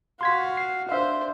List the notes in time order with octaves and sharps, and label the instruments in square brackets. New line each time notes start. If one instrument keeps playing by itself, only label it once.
[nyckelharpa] F#4 F5 [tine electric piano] C6 G#6 B6
[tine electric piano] C7
[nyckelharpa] D4 C5 [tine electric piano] E5 F5